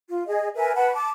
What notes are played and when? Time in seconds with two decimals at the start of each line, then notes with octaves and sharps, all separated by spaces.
0.09 F4
0.27 G#4 D#5
0.55 A#4 B4 E5 G#5
0.75 B4 F#5 A5 B5
0.93 A5 D6